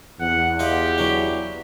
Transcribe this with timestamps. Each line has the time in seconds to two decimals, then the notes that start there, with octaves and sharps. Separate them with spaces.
0.20 E2 F#5
0.59 F4 G4 D#5 F#5
0.98 E3 F#3 D4